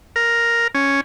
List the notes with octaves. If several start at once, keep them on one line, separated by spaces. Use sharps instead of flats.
A#4
C#4